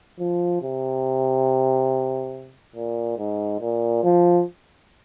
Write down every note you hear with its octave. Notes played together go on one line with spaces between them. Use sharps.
F3
C3
A#2
G#2
A#2
F3